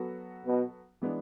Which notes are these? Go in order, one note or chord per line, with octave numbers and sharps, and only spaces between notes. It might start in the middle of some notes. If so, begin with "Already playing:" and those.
Already playing: F#3 B3 F#4 A4
B2
E3 G#3 B3 D4